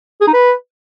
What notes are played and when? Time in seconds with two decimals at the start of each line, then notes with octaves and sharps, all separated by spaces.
0.21 G#4
0.27 D#4
0.33 B4